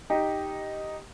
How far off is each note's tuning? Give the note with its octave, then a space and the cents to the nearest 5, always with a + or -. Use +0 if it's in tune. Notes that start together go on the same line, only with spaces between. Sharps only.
D#4 +0 G4 +0